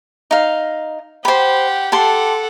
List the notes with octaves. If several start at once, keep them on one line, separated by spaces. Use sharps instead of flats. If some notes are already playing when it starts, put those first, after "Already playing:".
D#4 F5
G4 C5 F#5 B5
G4 A4 F#5 A5 C6